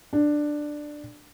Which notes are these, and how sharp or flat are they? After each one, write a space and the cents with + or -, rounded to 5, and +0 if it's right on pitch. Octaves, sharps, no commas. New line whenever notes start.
D4 +10